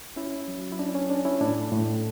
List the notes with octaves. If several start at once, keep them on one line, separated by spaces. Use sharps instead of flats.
C#4 E4
F#3
E4
C#4 D4
C#4
C#4 D4
C#4 E4
A2 D4
A2